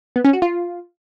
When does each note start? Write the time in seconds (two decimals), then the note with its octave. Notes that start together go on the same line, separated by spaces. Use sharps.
0.16 B3
0.25 C#4
0.33 F#4
0.42 F4